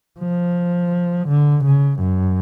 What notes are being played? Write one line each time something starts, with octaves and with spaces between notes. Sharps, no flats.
F3
D3
C#3
F#2